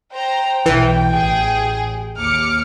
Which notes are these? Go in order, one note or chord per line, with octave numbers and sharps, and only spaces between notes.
C5 G5 A#5
B1 E3
A1 G#4
D#2 D6 F6 C#7